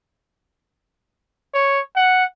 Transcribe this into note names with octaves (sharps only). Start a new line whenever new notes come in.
C#5
F#5